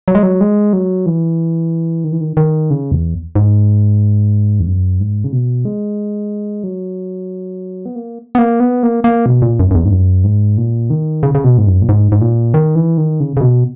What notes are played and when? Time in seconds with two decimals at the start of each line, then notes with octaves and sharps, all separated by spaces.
0.08 F#3
0.15 G#3
0.23 F#3
0.41 G#3
0.73 F#3
1.06 E3
2.04 D#3
2.12 E3
2.21 D#3
2.37 D#3
2.71 C#3
2.92 E2
3.35 G#2
4.60 E2
4.67 F#2
5.00 G#2
5.24 C#3
5.32 B2
5.65 G#3
6.64 F#3
7.86 B3
7.96 A#3
8.35 B3
8.38 A#3
8.60 B3
8.83 A#3
9.04 A#3
9.26 B2
9.42 A#2
9.60 F#2
9.71 F#2
9.75 E2
9.85 G#2
9.91 F#2
10.24 G#2
10.57 A#2
10.90 D#3
11.23 C#3
11.35 C#3
11.44 B2
11.58 G#2
11.67 F#2
11.82 A#2
11.89 G#2
12.12 G#2
12.21 A#2
12.54 D#3
12.75 E3
12.98 D#3
13.20 C#3
13.37 C#3
13.41 B2